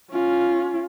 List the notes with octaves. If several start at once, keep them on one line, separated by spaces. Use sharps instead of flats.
C#4 F4